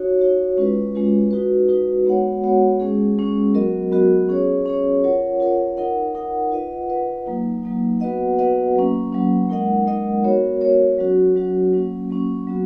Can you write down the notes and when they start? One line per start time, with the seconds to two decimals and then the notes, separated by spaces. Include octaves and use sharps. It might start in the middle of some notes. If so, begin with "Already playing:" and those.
Already playing: D#4 F#4 C#5
0.19 D#4 F#4 C#5
0.57 G#3 C#4 F4 B4
0.94 G#3 C#4 F4 B4
1.31 D#4 F#4 B4
1.68 D#4 F#4 B4
2.05 G#3 B3 F#4 C#5 F#5
2.43 G#3 B3 F#4 C#5 F#5
2.80 G#3 C#4 G#4
3.17 G#3 C#4 G#4
3.54 F#3 B3 F#4 A#4 D#5
3.92 F#3 B3 F#4 A#4 D#5
4.29 C#4 G#4 C#5
4.66 C#4 G#4 C#5
5.04 F4 A#4 C#5 F#5
5.40 F4 A#4 C#5 F#5
5.77 D#4 A#4 D#5 F#5
6.15 D#4 A#4 D#5 F#5
6.52 F4 B4 D#5 F#5
6.89 F4 B4 D#5 F#5
7.27 F#3 A#3 D#4
7.63 F#3 A#3 D#4
8.00 B3 F#4 B4 D#5 F#5
8.38 B3 F#4 B4 D#5 F#5
8.76 F#3 A#3 C#4
9.13 F#3 A#3 C#4
9.49 G#3 D#4 A#4 D#5 F#5
9.87 G#3 D#4 A#4 D#5 F#5
10.24 B3 F#4 A#4 C#5
10.61 B3 F#4 A#4 C#5
10.99 F#3 C#4 F#4
11.36 F#3 C#4 F#4
11.73 F#3 A#3 C#4
12.10 F#3 A#3 C#4
12.47 F#3 B3 F#4